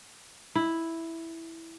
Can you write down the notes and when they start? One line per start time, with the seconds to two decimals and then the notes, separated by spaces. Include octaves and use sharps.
0.55 E4